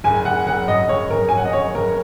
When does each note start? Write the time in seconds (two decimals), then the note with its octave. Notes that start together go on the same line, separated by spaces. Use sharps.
0.04 F#1 G#5
0.25 F#1 F#5
0.46 F#1 F#5
0.67 F#2 D#5
0.89 F#1 C#5
1.10 F#1 A#4
1.29 F#2 G#5
1.37 F#5
1.45 D#5
1.53 F#1 C#5
1.74 F#1 A#4